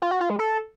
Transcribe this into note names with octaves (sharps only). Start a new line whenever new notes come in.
F4
F#4
F4
G#3
A4